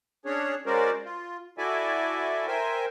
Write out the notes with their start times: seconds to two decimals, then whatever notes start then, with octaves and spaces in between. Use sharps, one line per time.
0.25 C#4 D4 G#4 C#5
0.66 G#3 C#4 F#4 A#4 C5 D5
1.05 F4
1.58 E4 F#4 A4 D5 E5 G#5
2.47 A#4 C5 E5 G5 G#5